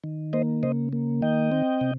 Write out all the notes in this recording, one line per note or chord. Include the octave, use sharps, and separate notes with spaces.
D#3
A#3 C5 D#5
C#3 C5 D#5
A#3
D#3 D#5 G5
C4
C3